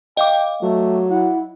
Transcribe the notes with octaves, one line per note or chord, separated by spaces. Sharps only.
D#5 F5 G5 D6
F#3 A3
E4 F#5